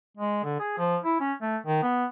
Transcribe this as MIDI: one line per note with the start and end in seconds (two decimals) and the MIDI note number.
0.17 0.40 56
0.44 0.58 50
0.60 0.76 68
0.78 0.97 53
1.04 1.16 64
1.20 1.33 61
1.42 1.57 57
1.66 1.81 51
1.83 2.05 59